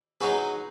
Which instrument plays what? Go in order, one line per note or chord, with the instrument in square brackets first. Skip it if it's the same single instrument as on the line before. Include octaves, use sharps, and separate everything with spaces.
[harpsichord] F#3 D#4 F#4 B4 [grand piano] G#4